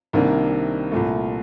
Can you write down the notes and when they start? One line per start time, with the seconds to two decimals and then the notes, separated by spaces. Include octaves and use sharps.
0.13 C2 C3 D#3 A#3 D4
0.91 C2 A#2 A3